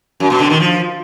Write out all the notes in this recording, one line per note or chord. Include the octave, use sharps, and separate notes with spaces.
F#2
B2
D3
D#3
F3